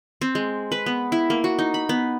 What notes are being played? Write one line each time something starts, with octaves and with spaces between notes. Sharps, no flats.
C4
G#3
B4
B3
E4
A#3
F#4
D#4
B5
B3